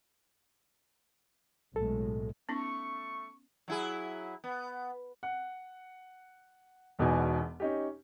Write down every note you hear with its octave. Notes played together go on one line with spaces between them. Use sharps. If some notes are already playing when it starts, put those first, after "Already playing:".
B1 A2 G#3 A4
A3 B3 C#4 D#4 C#6
F#3 E4 G#4
B3
F#5
E1 E2 B2 D#4 B4 G#5
C#4 D#4 G4